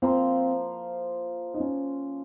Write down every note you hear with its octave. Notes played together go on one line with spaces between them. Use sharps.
F3 A#3 C4 F4 C5
D#4
C#4